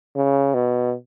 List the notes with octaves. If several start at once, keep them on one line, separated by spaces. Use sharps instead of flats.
C#3
B2